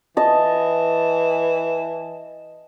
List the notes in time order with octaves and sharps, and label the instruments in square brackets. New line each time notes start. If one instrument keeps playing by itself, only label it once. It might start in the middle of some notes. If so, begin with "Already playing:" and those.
[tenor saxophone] E3 [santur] D#5 A5